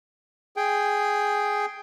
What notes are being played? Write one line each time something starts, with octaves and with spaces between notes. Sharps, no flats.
G#4 G5